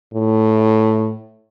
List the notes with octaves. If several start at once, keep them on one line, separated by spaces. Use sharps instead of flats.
A2